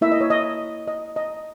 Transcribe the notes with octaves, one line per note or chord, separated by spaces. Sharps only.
A#3 E4 E5
D#5
C#5
D#5
D#5
D#5